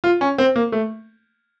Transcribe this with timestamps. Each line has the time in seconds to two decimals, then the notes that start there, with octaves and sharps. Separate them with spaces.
0.04 F4
0.21 C#4
0.38 C4
0.56 A#3
0.72 A3